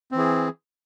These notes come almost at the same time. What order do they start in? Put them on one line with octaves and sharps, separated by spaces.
C4 E3 G#4